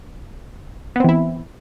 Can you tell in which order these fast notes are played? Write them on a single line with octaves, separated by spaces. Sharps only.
B3 C4 E3 E4